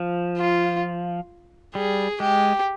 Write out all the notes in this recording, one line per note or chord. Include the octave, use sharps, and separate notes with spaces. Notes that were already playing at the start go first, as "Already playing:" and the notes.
Already playing: F3
F4
G3 G#4
G#3 G4